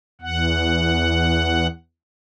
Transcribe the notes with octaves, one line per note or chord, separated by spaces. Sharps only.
E2 F#5